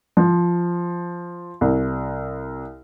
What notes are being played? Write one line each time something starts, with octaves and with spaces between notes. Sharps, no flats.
F3
C2